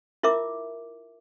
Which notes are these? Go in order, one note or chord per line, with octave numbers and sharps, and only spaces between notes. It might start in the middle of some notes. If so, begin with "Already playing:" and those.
E4 F4 A#4 E5 D6